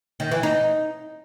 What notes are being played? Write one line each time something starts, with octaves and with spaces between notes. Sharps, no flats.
D#3
E3
D#4